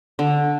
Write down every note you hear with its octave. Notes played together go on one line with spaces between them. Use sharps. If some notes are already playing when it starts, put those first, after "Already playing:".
D3